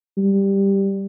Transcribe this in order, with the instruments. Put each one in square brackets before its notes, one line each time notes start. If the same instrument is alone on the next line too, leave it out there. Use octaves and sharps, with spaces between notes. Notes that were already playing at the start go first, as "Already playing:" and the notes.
[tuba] G3